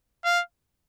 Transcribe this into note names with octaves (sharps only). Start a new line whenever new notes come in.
F5